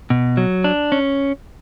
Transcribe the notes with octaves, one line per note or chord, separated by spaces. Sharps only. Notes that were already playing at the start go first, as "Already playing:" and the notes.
B2
F#3
D4
C#4